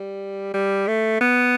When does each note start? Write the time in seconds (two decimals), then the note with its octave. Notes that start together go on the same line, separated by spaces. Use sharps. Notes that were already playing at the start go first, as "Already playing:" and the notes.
Already playing: G3
0.54 G3
0.88 A3
1.21 B3